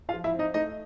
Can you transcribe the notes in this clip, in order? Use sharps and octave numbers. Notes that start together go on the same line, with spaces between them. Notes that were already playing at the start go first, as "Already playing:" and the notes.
F4 F5
F3
E4 E5
C4
D#4 D#5
A3 D#4 D#5